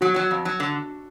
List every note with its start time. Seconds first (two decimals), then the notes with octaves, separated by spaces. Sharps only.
0.01 F#3 F#4
0.16 F#3
0.31 F2
0.45 F#3
0.60 D3